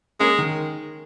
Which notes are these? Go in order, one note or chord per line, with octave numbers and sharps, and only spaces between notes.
G#3 A#3 C#4
D#3